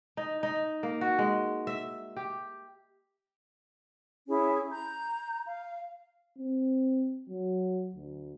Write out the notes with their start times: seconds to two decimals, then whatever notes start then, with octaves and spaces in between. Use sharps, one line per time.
0.17 D#4
0.43 D#4
0.83 A#3
1.01 F#4
1.18 G#3
1.67 E5
2.17 G4
4.28 C#4 E4 G#4 C#5
4.70 A#5 G6
5.47 F5
6.38 C4
7.30 F#3
7.95 D2